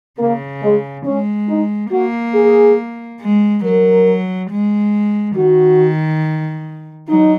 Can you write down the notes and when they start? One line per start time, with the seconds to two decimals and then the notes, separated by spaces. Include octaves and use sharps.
0.19 C#3 A#3
0.63 G#3
1.05 G#3 C#4
1.49 D#4
1.92 A#3 F#4
2.35 G#4
3.21 G#3
3.64 F#3 A#4
4.50 G#3
5.36 D#3 F#4
7.08 F#3 D#4